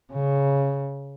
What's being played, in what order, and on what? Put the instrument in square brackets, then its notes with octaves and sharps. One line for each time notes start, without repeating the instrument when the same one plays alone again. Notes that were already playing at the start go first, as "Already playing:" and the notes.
[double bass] C#3